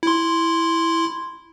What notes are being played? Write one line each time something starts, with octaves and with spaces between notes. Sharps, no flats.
E4 C6